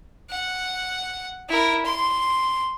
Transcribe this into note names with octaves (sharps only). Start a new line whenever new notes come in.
F#5
E4 A#4
C6